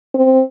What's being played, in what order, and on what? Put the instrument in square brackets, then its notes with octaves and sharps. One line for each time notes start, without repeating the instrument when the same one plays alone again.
[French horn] C4